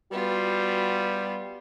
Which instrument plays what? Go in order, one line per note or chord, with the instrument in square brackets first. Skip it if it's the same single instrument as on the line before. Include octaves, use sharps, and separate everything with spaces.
[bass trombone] G3 [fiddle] B3 F4 [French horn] F#4